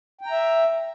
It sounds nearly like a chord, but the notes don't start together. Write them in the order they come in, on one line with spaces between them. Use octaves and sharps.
G5 A#5 E5